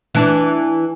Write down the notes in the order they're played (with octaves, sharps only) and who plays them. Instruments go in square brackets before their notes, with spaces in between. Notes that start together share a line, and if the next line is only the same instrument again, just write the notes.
[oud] E3 D4